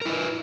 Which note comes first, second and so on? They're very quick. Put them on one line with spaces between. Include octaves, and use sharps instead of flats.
A#4 E4 B4